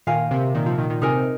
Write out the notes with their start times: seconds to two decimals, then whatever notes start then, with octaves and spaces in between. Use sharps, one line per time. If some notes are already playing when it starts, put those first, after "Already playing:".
0.07 A#2 D#3 A#4 F5 G#5
0.31 C3
0.55 A#2 D#3
0.66 C3 F3
0.78 A#2 D#3
0.90 A#2 D#3
1.02 C3 D#4 A#4 G#5